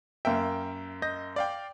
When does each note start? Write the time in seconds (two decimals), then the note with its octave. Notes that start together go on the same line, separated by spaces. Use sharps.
0.25 F#2 A#3 E5 G5
1.02 D#5 G6 A#6
1.36 D5 F5 G5